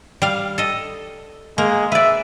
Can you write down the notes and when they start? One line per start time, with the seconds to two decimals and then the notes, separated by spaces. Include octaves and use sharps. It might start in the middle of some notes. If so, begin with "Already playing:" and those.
0.22 G3 F5
0.58 A4 D#5
1.58 G#3 A#3
1.92 B4 D5 E5